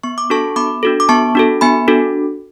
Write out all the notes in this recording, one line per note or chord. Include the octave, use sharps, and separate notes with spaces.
B3 C#6
D6
D4 F#4 A4 A5 C#6
B3 B5 D6
D4 F#4 A4
D6
B3 A5 C#6
D4 F#4 A4
B3 G#5 B5
D4 F#4 A4